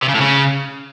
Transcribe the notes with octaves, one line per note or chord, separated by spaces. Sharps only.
C3
C#3
A2
C#3